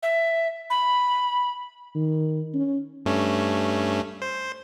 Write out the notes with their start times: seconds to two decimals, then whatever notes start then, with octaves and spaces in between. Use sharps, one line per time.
0.03 E5
0.70 B5
1.95 D#3
2.54 C#4
3.06 G2 A3 C#4
4.22 C5